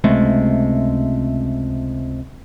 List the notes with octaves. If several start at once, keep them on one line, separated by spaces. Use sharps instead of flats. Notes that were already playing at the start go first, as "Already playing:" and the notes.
C#2 C3 G#3 A3